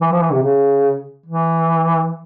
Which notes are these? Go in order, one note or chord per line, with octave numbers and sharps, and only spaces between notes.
E3
F3
E3
C3
C#3
E3